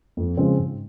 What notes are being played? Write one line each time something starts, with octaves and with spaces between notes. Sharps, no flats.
F2
C#3 F3 G#3 C4
G#2